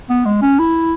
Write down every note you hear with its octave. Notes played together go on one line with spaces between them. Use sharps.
B3
G#3
C#4
E4